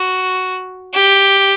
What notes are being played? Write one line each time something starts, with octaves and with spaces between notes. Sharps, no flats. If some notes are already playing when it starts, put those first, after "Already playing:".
Already playing: F#4
G4